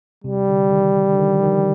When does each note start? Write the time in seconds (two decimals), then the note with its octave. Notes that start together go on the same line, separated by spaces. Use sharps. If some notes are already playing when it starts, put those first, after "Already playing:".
0.24 C3 G3
0.49 D3
0.71 D#3
1.12 D3
1.19 D#3
1.34 F3
1.43 D#3